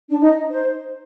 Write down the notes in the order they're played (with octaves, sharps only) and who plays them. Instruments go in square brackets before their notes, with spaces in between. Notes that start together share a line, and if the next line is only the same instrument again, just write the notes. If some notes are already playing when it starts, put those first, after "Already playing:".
[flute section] D4
D#4
C5